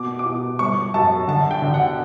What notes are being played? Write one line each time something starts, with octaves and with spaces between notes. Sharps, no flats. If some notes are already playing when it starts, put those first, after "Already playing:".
Already playing: B2 D6
D6
B2
G1 C#6
F#2 A5
D3 A5
G5
D3
F#5